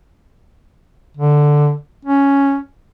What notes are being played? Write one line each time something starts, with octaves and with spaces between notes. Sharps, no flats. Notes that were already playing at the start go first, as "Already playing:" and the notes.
D3
C#4